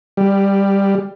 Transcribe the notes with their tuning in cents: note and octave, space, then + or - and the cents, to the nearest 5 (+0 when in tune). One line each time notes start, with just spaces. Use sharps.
G3 +10